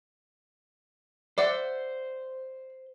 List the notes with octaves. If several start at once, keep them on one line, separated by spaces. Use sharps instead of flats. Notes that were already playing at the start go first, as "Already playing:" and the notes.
C5 D5 E5 F#5